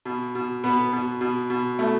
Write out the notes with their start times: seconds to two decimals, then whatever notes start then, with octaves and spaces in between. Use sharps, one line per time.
0.05 B2
0.35 B2
0.64 B2 B3
0.93 B2
1.21 B2
1.50 B2
1.79 B2 A3